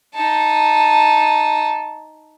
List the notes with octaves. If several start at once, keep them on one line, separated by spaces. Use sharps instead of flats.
D#4 A5